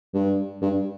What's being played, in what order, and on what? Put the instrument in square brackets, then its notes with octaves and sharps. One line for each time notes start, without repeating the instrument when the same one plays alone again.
[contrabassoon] G2
G2